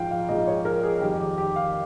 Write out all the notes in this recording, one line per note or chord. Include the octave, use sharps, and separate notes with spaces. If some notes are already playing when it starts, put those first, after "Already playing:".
Already playing: A#1 G#2 F3 G#3 F5 G5
F5
A#1 G#2 F3 G#3 D#5
C#5
A#4
G#4
F2 D#3 G3 G4
G4
G4
F5